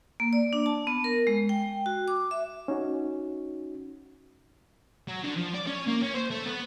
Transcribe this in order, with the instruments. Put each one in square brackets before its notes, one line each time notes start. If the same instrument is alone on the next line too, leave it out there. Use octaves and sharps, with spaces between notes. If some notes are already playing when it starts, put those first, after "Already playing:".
[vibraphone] A#3
D5
D4
A5
B3
A#4
G#3
G5
F#4
D6
E5
[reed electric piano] C#4 D#4 F#4
[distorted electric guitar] F#3
D3
F3
D5
C#4
A#3
C#4
C5
A3
B3